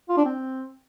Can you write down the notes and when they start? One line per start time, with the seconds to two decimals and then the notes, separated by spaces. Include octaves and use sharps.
0.09 F4
0.17 D4
0.26 C4